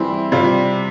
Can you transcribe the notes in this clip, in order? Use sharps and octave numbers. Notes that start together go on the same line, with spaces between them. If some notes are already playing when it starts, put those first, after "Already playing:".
Already playing: E3 G3 C4 E4
C3 G3 D4 F4